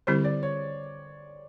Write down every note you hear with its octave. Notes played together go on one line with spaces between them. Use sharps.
D3 G3 C4 E4 G4 C5
D5
C#5